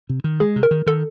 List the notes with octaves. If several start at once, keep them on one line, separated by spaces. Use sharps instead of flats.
C3
D#3
G#3 G#4
C3
A#4
D#3
D#3 A4